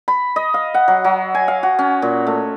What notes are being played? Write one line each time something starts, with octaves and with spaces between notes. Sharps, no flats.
B5
D#5
F5
F#5
F#3
F#3
G#5
F5
F#4
C#4
A#2
A3